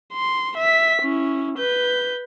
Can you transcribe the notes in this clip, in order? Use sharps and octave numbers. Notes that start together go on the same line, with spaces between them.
C6
E5 B6
C#4 E4
B4 G6